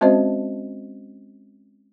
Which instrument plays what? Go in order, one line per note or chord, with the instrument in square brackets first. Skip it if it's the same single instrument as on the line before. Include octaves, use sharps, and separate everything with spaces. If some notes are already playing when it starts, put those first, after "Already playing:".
[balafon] G#3 C4 C#4 F#4 C5 D#5